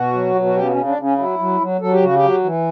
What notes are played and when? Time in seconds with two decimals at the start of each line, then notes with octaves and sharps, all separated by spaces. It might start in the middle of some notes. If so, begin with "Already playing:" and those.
Already playing: B2 F#4
0.14 F#3
0.34 B2
0.46 F#4
0.55 C#3 G4
0.65 B3
0.71 C#4
0.76 C#3
0.87 D4
0.98 C#3
1.03 C#4
1.18 F#3 E4
1.39 F#3
1.60 F#3
1.81 F#3 A4
1.92 G4
2.02 C#3 F#4
2.16 G4
2.23 F#3
2.44 E3